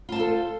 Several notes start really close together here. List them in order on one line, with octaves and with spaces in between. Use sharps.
F4 A5 C5 A4